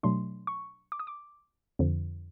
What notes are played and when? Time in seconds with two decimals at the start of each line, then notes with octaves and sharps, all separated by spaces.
0.03 B2 F#3 A3 D4 C6
0.47 C#6
0.92 D6
1.00 D#6
1.07 D6
1.79 F2 D3 F3